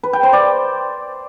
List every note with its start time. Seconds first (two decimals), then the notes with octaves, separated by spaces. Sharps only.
0.03 B4
0.13 G5
0.23 C5
0.33 D5